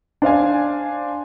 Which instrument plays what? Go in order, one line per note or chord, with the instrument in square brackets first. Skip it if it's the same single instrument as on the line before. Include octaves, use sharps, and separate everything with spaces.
[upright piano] D4 C5 F5 G#5